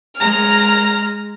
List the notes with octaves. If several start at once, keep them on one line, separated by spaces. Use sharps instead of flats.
G#3 A#5 F6